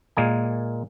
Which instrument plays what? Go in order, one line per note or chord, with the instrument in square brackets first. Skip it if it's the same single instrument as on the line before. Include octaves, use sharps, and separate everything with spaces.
[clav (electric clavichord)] A#2 G#3 A#3 G#5